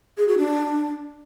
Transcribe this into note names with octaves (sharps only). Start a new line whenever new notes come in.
G#4
F#4
D4